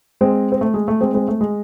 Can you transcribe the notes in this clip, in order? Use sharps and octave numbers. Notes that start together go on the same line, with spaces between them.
G#3 C4
C4
A3
G#3
A3
G#3 C4
G#3 C4
A3
G#3